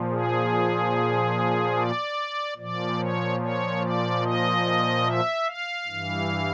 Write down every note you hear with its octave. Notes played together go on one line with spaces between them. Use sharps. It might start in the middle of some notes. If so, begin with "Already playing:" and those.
Already playing: A#2 F3
G#4
D5
A#2 F3 D5
C#5
C#5
D5
D#5
E5
F5
G2 E3